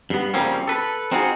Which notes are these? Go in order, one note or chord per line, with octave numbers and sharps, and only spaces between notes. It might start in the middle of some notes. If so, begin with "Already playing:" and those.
G2 B3
C#3 F3 G3 A#3 C4 C#4
A4 B4
C4 D#4 F4 F#4 G#4